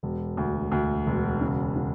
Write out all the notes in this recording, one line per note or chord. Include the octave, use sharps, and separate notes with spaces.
E1
D2
D2
E1
C#3
C#3